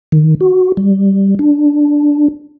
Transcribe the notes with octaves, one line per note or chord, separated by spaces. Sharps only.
D#3
F#4
G3
D4